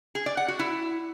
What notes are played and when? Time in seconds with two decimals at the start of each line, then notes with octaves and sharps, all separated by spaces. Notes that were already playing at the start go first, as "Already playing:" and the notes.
0.15 G#4
0.26 D5
0.37 F#5
0.48 F#4
0.59 E4